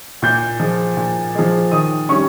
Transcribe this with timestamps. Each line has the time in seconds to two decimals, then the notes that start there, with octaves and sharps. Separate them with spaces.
0.22 A#2 G6
0.60 F3 G#3
0.97 A#2
1.35 F3 G#3
1.71 D#3 D#6
2.09 G3 C#4 C#6